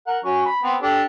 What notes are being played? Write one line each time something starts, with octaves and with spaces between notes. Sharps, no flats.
A#4 F#5
F#3 C#4 C#6
B5
B3 C4
D4 G4 A4